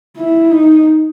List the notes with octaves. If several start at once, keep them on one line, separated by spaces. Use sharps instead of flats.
E4
D#4